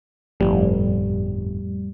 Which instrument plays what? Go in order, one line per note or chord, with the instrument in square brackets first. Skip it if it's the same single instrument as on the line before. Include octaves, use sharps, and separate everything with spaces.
[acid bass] G1 [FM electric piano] F2 A2 G3